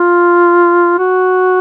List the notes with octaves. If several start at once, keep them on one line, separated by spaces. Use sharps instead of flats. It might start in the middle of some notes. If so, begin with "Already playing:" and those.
Already playing: F4
F#4